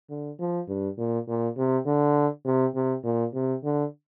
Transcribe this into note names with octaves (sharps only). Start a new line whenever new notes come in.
D3
F3
G2
A#2
A#2
C3
D3
C3
C3
A#2
C3
D3